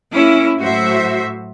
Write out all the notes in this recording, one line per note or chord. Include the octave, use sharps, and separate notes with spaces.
A#3 C#4 E4
A2 F#3 F#4 C5 E5